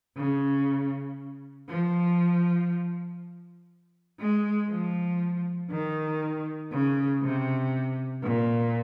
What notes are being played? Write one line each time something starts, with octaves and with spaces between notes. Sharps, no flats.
C#3
F3
G#3
F3
D#3
C#3
C3
A#2